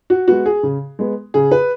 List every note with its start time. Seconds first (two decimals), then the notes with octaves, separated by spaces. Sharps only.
0.10 F#4
0.28 G#3 B3 F#4
0.46 G#4
0.63 C#3
0.99 G#3 B3
1.34 C#3 G#4
1.51 B4